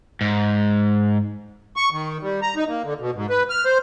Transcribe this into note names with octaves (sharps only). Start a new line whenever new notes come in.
G#2
C#6
D#3
G3
A#5
D#4
A#3
D3
B2
G#2
B4
F6
C5